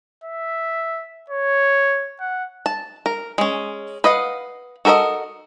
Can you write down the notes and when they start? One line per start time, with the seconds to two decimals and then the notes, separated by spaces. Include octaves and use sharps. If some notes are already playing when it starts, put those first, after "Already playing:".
0.24 E5
1.30 C#5
2.20 F#5
2.66 A5
3.06 A#4
3.38 G#3 C#4
4.04 B4 D#5 F5 F#5
4.85 F#4 A4 A#4 D5 D#5